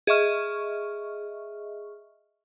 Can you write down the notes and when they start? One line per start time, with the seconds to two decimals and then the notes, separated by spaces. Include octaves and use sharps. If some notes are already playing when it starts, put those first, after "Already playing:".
0.07 G#4 D#5 E5 C#6 F6